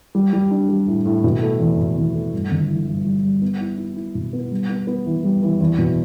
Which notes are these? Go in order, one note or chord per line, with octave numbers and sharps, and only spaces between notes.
G3
G3
D4
G3
A2
A2
B2
A3
E2
B2
E2
A3
G2
G1
E3
G2
G3
G3
B3
E4
E4
E4
B2
B3
G3
B3
B3
E3
G3
E3
E2
B2